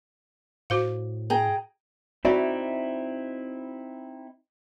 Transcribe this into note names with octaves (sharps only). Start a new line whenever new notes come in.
A2 F#4 C5 F5
G#4 G5 A#5
C4 D#4 E4 F#4 D5 E5